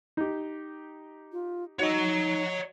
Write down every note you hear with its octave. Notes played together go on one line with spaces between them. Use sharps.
D#4 G4
F4
D#4 F#4 C#5 D#5 A#5